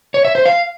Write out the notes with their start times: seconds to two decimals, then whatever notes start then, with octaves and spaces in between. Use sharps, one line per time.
0.14 C#5
0.25 E5
0.35 C5
0.45 F5